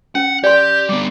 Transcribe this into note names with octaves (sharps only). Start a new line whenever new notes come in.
C#4 F#5
G4 D5 C6 G6
G3 B3 D6